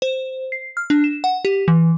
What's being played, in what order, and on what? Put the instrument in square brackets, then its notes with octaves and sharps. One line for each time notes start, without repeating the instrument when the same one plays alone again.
[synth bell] C5
C7
F6
D4
E7
F#5
G4
E3